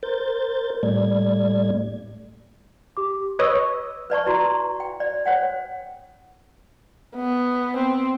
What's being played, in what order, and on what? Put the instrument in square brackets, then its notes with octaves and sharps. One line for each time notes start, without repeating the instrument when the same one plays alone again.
[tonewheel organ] A#4 C5 G6 A6
A2 G3 A3 D5 G#6
[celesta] G4 D6
[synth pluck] B4 C#5 D#5 [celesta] C#6 E6
[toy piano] B4 D5 A5 C#6
E4 F#4 A#5
G5
D5
C5 C#5 F#5 G5
[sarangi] B3
C4